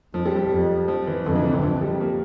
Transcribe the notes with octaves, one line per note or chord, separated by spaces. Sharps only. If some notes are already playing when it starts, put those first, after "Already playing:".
F2 F3
G3
F3
F2
F3
E3
F2 D3
E3
C3
D3
F2 F3
G3
A#3